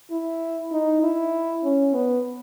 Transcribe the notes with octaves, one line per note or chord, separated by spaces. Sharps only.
E4
D#4
E4
C#4
B3